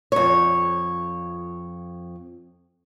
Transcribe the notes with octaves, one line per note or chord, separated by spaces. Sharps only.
F2 C#5